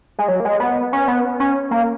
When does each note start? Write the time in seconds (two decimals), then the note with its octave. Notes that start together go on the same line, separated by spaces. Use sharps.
0.19 G#3
0.28 F#3
0.40 A#3
0.45 G#3
0.60 B3
0.93 C#4
1.08 B3
1.40 C#4
1.71 A#3